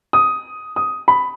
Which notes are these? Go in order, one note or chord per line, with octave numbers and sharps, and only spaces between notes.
D#6
D#6
B5